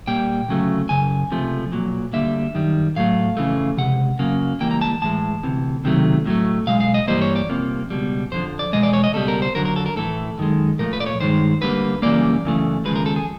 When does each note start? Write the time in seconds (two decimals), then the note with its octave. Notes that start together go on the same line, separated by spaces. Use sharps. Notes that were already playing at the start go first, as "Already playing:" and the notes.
0.07 A#2 G3 A#3 G5
0.48 D2 C#3 F#3 A3
0.89 F#2 C#3 G#5
1.31 C#2 C3 F3 A3
1.72 B1 A#2 F#3
2.13 D2 D3 G3 A#3 E5
2.54 F#2 D#3 G3
2.96 A2 F#3 A3 F5
3.37 F2 C#3 E3 A3
3.78 C#2 C3 F#5
4.19 F#2 C#3 F#3 A#3
4.60 C#2 C3 E3 G3 A#3 G5
4.71 A#5
4.81 A5
5.02 A2 E3 G#3 A5
5.43 D2 C3 E3
5.84 C#2 C3 D#3 F#3 A3
6.26 A2 F#3 A3
6.67 B1 B2 G#3 F5
6.80 F5
6.94 D#5
7.08 G2 E3 G3 A#3 C5
7.22 C#5
7.36 D5
7.49 C2 C3 F3 A#3
7.90 C#2 B2 G3
8.31 F2 D3 F3 C5
8.59 D5
8.73 E2 B2 G#3 D#5
8.83 D5
8.93 C#5
9.04 D#5
9.14 C#2 B2 G3 A4
9.28 A#4
9.42 C5
9.55 F2 D3 F#3 A#4
9.65 A#4
9.76 A4
9.86 A#4
9.96 A2 E3 A3 A4
10.38 F#2 D#3 G#3
10.79 A#2 F3 A3 A#4
10.93 B4
11.00 D5
11.06 C#5
11.20 G2 D#3 G#3 C5
11.61 D2 D3 G3 A#3 B4
12.02 F#2 C#3 E3 G3 A#3 D5
12.44 F#2 C#3 E3 A3
12.85 D#2 C#3 F3 G#3 B4
12.96 A#4
13.06 A4
13.16 G#4